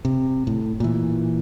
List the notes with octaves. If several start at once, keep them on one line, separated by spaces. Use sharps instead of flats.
C3
A2
A#2 E3